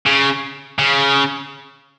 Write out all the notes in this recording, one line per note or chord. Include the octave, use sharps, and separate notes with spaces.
C#3
C#3